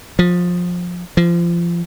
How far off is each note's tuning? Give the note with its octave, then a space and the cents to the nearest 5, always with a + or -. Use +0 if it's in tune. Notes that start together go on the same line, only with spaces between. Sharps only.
F3 +20
F3 -25